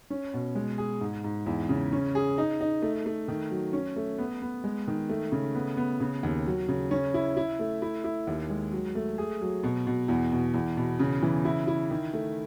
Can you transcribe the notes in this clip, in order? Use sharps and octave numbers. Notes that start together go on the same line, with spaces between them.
C#4
B2
G#3
G#4
G#2
G#2
E2
C#3
C#4
G#4
D#4
D#4
A3
A3
D#3
F#3
C#4
A3
B3
B3
G#3
D#3
A3
C#3
B3
B3
C#3
D#2
F#3
C#3
C#4
E4
E4
A3
E4
E4
D#2
G#3
F#3
A3
G#4
F#3
B2
B2
E2
B2
E2
B2
C#3
E3
E4
E4
D#3
A3